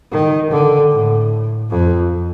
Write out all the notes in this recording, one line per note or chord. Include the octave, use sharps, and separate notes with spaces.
D#3
D3
A2
F2